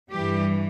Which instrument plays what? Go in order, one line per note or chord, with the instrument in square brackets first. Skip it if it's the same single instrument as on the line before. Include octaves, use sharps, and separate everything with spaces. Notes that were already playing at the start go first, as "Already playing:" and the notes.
[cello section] G2 E3 G3 G4